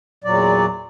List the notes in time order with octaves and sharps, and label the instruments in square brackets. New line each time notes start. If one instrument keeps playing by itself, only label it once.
[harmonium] E2 A#2 F#3 D5